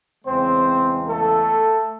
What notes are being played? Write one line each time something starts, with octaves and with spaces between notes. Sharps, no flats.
E2 C#3 G#3 C4 C5
A3 A4